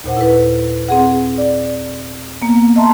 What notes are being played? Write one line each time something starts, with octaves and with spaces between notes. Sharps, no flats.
D#2 A#2 C5 F#5
E4 A4 B4
C4 G#4 F#5
D5
A#3 B3
D#5 E5 A5 A#5 C6